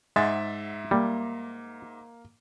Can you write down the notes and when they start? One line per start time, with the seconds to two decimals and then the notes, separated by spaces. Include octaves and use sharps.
0.16 G#2 G#3 E5 F#5 A6
0.91 G3 A#3